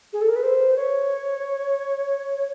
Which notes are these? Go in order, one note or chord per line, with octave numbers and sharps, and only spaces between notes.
G#4
A4
A#4
B4
C5
C#5